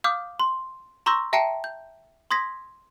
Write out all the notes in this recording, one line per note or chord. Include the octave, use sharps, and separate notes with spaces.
F5 D6 D#6 F6 G6
C6
A#5 C6 C#6 E6 G6 A#6
E5 G5 A5 A#5 C7 C#7
G6
C6 D#6 G#6 A#6 B6